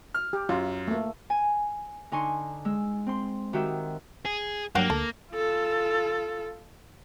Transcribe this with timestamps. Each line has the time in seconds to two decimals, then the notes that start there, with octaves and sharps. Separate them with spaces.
0.14 F6
0.33 G4
0.49 F#2 F4
0.88 A3 A#3
1.30 G#5
2.12 D3 D#4 G#5 C6 C#6
2.65 G#3 E6
3.07 C4 C6
3.53 D#3 F#4 G4 E5
4.25 G#4
4.75 G2 F#3 A#3 D4 G4 F#5
4.90 D2 A4
5.33 F4 A4